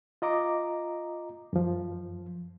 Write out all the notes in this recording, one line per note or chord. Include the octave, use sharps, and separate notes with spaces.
F4 D#5 A#5 D6
F#2 F3